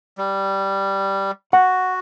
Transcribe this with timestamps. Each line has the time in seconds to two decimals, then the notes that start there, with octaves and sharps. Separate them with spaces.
0.18 G3
1.53 F#4 F#5